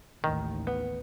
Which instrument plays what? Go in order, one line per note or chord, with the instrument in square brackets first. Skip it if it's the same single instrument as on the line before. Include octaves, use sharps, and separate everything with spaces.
[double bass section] A1 D#2 [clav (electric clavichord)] D#3
[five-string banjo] B3